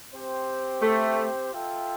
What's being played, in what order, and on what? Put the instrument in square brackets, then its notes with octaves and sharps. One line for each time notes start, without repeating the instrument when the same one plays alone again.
[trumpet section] C4 G4 C5 G5
[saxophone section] A3
[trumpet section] F4 A4 E5 G5